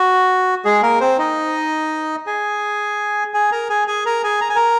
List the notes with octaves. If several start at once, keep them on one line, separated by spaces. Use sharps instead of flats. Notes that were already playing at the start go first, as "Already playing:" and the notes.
Already playing: F#4
G#3 G#4
A#3 A#4
C4 C5
D#4 D#5
G#4 G#5
G#4 G#5
A#4 A#5
G#4 G#5
G#4 G#5
A#4 A#5
G#4 G#5
A#5
G#5
A#4 A#5